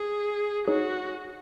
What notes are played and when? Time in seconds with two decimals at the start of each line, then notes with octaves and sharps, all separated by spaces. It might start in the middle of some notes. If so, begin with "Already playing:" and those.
Already playing: G#4
0.68 D#4 F#4 G#4 C#5